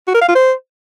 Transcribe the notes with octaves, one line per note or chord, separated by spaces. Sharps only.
F#4
A#4
F5
F4
C5